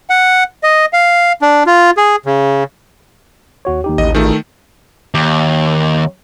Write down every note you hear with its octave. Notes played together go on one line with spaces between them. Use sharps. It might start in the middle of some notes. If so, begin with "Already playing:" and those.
F#5
D#5
F5
D4
F4
G#4
C#3
D#2 F#4 C#5
D#2 D#4 G4
A1 D#5
D#3 A3 F4 G#4
D#2